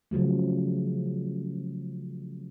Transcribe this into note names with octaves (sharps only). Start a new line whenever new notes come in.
C#3 F3 F#3 A3